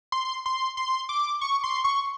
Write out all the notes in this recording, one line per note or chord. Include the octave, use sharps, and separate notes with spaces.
C6
C6
C6
D6
C#6
C6
C#6